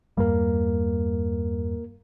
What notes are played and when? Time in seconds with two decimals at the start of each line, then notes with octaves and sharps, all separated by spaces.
0.17 E2 G2 G3 A#3 A#4